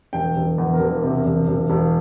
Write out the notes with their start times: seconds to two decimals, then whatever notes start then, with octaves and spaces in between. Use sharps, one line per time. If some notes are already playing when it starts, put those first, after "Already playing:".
0.13 E1 G5
0.36 E1
0.58 E2
0.74 A#4
0.80 E1
1.03 C3
1.25 E1
1.48 E1
1.70 E1